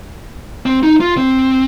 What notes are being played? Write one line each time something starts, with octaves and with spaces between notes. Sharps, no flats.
C4
D#4
F4
C4